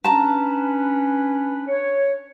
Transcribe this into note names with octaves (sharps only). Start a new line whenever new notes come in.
C#4 D4 B4 A5 A#5
C#5